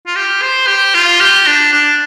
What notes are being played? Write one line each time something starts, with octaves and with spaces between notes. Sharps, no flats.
F4
G4
C5
G4
F4
G4
D4
D4